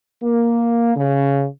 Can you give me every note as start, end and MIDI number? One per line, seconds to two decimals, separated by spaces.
0.23 0.93 58
0.96 1.45 49